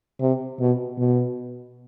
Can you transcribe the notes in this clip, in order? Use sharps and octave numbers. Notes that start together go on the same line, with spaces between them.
C3
B2
B2